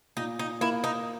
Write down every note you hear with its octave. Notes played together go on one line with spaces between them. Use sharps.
A#2 D#4
D#4
A#3 E4
D#4